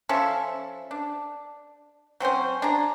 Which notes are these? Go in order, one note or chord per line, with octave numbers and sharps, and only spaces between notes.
F3 C#4 A4 E5
D4
F#3 C4 C#4 C5
D4 G#4 A#5